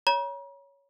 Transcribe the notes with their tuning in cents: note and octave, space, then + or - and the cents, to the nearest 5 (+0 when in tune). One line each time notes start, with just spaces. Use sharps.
C#5 +10 A#5 +45